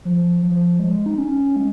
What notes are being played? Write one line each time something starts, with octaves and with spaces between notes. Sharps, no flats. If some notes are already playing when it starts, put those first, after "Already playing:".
F3
F3
G#3
D#4
C#4
G#3